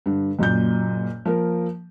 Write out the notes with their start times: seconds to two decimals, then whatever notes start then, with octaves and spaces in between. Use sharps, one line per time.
0.06 G2 D3
0.39 F#1 F#2 A#2 G6
1.25 F3 A#3 A#4